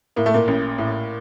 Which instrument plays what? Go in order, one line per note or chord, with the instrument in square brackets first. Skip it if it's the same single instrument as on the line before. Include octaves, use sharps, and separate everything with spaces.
[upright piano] A2 A#3
A3
A#2 A#3
A1
A2